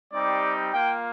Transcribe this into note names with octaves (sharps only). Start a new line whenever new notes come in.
G3 C4 D#4 G4 D5
A#3 F4 G5